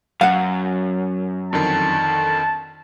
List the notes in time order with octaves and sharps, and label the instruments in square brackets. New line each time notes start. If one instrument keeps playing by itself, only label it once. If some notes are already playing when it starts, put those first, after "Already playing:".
[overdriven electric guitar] F#2 [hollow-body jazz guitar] F5 F#5
[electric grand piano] F2 D3 D#3 [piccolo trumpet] A5